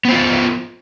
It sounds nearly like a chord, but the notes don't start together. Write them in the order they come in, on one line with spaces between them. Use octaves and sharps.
B3 C5 F4